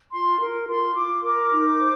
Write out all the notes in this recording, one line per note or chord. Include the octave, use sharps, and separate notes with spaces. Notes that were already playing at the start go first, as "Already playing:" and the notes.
F4 C6
A#4
F4 C6
F4 D6
A#4 D6
D#4
C5